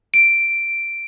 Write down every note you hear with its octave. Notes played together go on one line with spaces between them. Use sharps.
D7